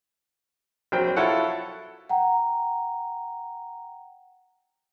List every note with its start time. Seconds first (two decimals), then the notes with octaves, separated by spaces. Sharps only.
0.92 A#1 F#3 C4 G5
1.16 E4 F4 A4 C#5 F#5
2.09 F#5 G5 A#5